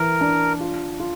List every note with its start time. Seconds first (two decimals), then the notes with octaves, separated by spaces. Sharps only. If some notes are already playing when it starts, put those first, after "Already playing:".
Already playing: E3 A#4
0.21 D4
0.60 F4
1.00 F4